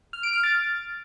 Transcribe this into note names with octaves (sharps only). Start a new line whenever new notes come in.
F6
D7
F6
A6